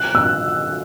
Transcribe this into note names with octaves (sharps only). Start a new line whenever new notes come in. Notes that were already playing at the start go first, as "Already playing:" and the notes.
Already playing: F#6
E6